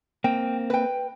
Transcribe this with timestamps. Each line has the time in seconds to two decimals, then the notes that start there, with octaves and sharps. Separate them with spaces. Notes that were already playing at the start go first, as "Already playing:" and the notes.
0.24 A#3 C4 G5
0.70 B4 G5